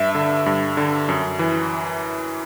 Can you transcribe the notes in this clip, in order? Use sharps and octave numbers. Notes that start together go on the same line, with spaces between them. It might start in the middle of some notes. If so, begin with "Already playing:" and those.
Already playing: G2 E5
D3
G2
D3
F#2
E3